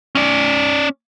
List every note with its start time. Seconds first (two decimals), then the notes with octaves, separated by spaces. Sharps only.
0.15 C#4 D5